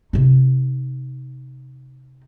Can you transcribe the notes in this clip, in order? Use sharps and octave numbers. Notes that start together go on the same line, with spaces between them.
C3 D#4